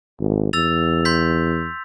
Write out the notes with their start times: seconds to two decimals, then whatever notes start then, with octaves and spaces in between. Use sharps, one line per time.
0.20 G#1
0.53 E2 E6 A6 F7
1.05 C6 G6 B6